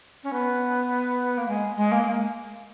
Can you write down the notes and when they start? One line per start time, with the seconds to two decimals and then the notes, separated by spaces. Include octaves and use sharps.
0.23 C#4
0.32 B3
1.37 A#3
1.48 G#3
1.76 G#3
1.91 A#3